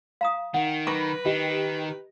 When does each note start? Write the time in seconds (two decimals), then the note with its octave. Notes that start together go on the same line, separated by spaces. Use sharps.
0.21 F5 A#5 D#6
0.54 D#3 F#5
0.87 B4 A#5 B5 C#6 D6 A#6 D7
1.25 D#3 G4 D#5